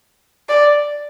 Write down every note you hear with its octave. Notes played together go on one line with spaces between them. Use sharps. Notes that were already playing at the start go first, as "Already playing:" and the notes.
D5